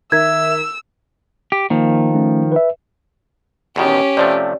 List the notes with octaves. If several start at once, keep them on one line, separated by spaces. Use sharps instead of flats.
D#3 A#4 E5 E6 G#6 B6
G4
D#3 F3 A#3
A3 C#4
B4 E5
E2 B2 D#3 C#4 G4
C3 F3 A3 D5